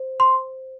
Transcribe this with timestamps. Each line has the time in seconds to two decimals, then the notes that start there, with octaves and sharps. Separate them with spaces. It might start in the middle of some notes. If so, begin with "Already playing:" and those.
Already playing: C5
0.20 C6